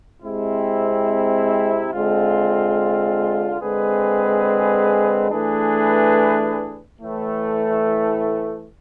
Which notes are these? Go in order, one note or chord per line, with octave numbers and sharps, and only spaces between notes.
C3 G#3 C4 E4
D3 G#3 C4 F4
D3 G#3 C4 G#4 B4
E3 A3 D4 G#4 B4
A2 E3 A3